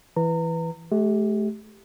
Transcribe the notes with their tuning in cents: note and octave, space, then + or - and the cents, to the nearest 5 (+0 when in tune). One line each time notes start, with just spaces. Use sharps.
E3 +0 B4 +0 A#5 -30
A3 -35 G4 +0